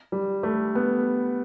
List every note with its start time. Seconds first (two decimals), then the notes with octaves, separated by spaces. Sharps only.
0.12 G3
0.43 A3
0.75 B3